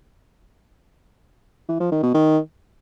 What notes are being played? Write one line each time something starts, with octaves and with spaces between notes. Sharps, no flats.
E3
F3
D#3
B2
D#3